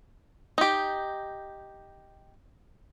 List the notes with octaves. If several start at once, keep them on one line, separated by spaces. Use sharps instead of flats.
D#4 G4